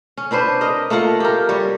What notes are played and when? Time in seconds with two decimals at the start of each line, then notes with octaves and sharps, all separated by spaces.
0.17 C#4
0.31 C4 D4 B4 C5
0.61 A#4 D#5
0.90 A3 A#3 F4 F#5
1.20 G4 A#4
1.49 G3 C#5